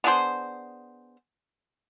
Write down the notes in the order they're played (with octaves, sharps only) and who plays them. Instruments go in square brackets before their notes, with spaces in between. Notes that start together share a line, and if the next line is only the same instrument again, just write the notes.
[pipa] B3 D4 G#4 C5